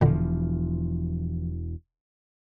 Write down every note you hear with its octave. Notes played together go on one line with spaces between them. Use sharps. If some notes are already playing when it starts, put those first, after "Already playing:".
E1 A#2 D3 E3 F3